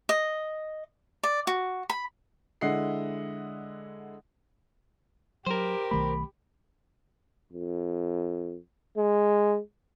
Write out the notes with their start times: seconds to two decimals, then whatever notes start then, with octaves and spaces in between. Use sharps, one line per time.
0.09 D#5
1.23 D5
1.47 F#4
1.90 B5
2.61 D3 G#3 E4 D#5 F#5 C7
5.47 F#3 G4 A#4 C5
5.91 B1 D#3 A3 B5
7.53 F2
8.97 G#3